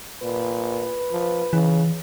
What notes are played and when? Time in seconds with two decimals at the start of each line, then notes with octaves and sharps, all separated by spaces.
0.22 A#2 B4
1.11 F3
1.53 C#3 E3